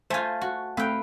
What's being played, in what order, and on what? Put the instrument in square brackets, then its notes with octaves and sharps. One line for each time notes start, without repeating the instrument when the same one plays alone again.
[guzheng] A3 F4 [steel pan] C5 G#5
[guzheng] F#4
[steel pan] A3 C4 F5 [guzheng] B4 G5